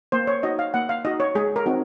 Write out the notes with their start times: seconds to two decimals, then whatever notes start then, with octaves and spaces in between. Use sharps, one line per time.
0.12 A#3 C5
0.27 C#5
0.43 D#4 F#4 D#5
0.59 F5
0.74 A#3 F#5
0.89 F5
1.05 D#4 F#4 D#5
1.20 C#5
1.35 G#3 G#4
1.56 A#4
1.66 C4 D#4 F#4